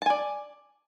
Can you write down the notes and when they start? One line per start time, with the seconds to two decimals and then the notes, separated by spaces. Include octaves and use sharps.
0.02 A5
0.06 G#5
0.10 D5